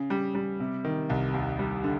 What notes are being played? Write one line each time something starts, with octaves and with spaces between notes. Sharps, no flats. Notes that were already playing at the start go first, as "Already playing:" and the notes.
Already playing: C#3
G3
G3
C3
D#3
C2
D#2
G3
D3